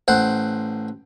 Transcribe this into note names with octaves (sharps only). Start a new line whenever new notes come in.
A1 C5 F#5